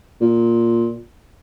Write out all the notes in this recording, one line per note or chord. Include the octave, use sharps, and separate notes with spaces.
A#2